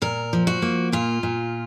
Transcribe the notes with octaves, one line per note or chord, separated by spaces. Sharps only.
A#2 A#4
F3
F#4
A#3
A#2 F4
A#2